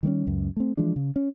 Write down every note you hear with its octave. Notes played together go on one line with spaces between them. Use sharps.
D#3 G3 A3 C#4
C#2 F#2
A3 C4
E3 F3 G#3 D4
C#3
C#4